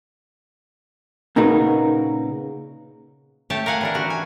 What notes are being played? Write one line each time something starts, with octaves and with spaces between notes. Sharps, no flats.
A#2 C#3 D#4 F#4 A#4 B4
A3 G4 C#5 A5
A#4 F5 F#5 G#5
E3 D4 A#4
E3 F#4 G4
G#5